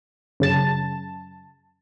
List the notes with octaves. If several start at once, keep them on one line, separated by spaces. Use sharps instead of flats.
F#2 C#3 A5